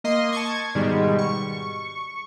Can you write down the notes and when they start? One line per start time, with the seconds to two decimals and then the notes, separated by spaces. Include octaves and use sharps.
0.04 A#3 D#5 C6
0.32 A5 C#6 G#6
0.75 G#2 B2 D#3 G3 G#3
1.19 C#6